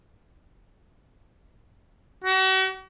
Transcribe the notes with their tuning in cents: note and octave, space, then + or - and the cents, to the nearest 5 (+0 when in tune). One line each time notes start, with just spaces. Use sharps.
F#4 +40